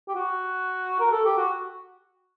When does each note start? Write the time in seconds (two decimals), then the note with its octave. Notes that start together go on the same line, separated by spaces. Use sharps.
0.08 G4
0.15 F#4
1.00 A#4
1.12 A4
1.25 G4
1.37 F#4